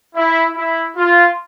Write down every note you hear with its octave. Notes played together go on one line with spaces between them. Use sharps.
E4
E4
F4